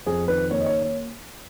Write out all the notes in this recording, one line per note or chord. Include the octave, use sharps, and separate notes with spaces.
F2 G#4
D#3 B4
A#3 C#5
D#5
C#5
C#5